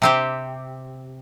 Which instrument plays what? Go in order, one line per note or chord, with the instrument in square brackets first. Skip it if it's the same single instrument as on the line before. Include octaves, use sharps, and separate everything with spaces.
[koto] C3 C4 G4